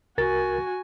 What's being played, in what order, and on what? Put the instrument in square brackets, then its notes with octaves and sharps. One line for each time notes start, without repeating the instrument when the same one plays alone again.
[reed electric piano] C2 A#4 A6 [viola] F#4 G#5